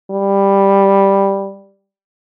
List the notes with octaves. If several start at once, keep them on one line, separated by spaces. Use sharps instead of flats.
G3